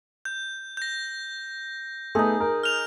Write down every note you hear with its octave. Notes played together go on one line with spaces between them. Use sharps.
G6
G6 A#6
A3 B3 D#4 G#4
A#4
F6 F7